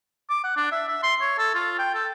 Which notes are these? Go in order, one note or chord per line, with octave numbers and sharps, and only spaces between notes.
D6
F#5
D4
E5
E5
C6
C#5
A4
F4
G5
A4